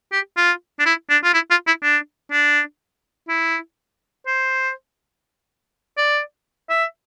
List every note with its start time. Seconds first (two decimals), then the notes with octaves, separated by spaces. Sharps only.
0.12 G4
0.37 F4
0.79 D4
0.86 E4
1.09 D4
1.24 F4
1.34 E4
1.50 F4
1.67 E4
1.82 D4
2.31 D4
3.28 E4
4.27 C5
5.97 D5
6.70 E5